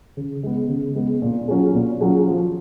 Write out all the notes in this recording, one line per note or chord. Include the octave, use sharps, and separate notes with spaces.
C#3
G#3 B3
C#3
G#3 B3
A#2
F#3 C#4 F4 G#4
A#2
F#3 C#4 F4 G#4
F3